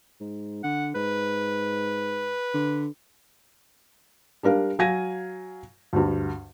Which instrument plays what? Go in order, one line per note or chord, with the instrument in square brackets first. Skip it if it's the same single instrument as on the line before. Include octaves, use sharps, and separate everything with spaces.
[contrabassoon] G#2
[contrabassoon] D3 [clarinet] F#5
[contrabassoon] G#2 [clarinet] B4
[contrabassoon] D3
[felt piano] G3 D4 A#4 F5
F#3 F5 G#5 G#6 A#6 D#7
D2 G2